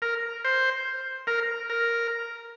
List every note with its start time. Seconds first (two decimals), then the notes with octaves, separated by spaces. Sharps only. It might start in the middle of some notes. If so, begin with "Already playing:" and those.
0.02 A#4
0.44 C5
1.27 A#4
1.70 A#4